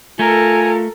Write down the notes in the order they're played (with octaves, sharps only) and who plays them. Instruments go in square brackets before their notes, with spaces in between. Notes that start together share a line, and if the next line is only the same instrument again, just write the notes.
[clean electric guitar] A3 [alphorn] F4 [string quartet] A4 A#4 [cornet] G#5